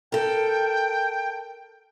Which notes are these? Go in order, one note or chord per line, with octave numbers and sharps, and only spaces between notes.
A4 A#4 G5